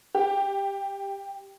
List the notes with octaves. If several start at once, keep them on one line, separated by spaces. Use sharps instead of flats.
G4